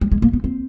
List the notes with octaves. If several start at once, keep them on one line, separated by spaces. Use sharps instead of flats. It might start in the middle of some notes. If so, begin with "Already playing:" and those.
G3
G#3
A#3
B3
C4